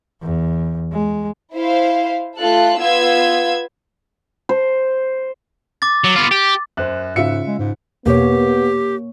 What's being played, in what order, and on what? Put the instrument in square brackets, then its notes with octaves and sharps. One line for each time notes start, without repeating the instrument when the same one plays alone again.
[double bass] E2
G#3
[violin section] E4 C5 F5
A3 F4 A4 F#6
B3 F4 E6 G#6
[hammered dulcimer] C5
[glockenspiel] D6 A6
[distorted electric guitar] F#3
B3 F4
G4
[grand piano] F#2 [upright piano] C5 F#6
[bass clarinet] G#2 [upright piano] C#3 F4 C#7 [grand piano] E5
[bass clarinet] G#3
G#2
[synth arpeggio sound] E2 B2 [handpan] A#3 C#5 [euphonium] B3 [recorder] G4